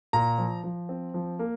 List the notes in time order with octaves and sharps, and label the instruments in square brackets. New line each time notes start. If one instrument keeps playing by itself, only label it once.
[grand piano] A#2 A#5
F3
F3
C4
F3
A#3